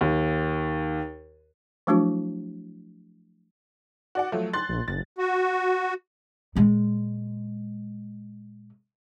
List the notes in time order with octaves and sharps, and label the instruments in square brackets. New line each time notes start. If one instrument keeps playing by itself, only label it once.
[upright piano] D#2
[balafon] F3 F#3 A3 D4 E4 F#4
[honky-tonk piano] F#4 D5 F#5
F3 F#3 A3
C6 F#6 A6
[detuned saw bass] A#1
[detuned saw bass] F#1 [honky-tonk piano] A6
[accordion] F#4
[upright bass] A#2 G#3